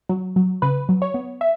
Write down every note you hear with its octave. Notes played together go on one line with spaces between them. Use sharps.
F#3
F#3
C#3 B4
F#3
C#5
B3
E5